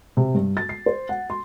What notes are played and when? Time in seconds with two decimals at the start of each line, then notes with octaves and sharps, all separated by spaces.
0.17 C3
0.34 G2
0.57 A6
0.69 C7
0.86 C5
1.09 F#5
1.30 C6